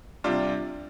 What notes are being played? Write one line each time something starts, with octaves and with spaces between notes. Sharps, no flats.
C3 G3 D4 F4